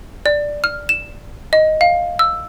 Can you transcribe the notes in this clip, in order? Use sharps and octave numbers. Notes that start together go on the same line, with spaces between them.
D5
F6
E7
D#5
F5
E6